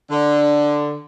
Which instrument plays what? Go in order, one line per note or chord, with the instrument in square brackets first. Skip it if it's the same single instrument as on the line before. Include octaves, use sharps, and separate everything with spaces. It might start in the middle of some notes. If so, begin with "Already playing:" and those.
[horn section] D3